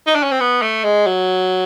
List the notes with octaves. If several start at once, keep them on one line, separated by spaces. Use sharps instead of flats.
D#4
D4
C#4
C4
B3
A3
G#3
F#3